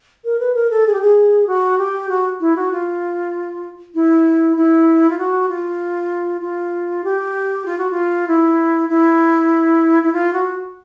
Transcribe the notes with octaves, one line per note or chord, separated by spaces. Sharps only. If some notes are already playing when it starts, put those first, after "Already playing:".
A#4
B4
A#4
A4
G#4
G4
G#4
F#4
G4
F#4
E4
F#4
F4
E4
E4
F4
F#4
F4
F4
G4
F4
F#4
F4
E4
E4
E4
F4
F#4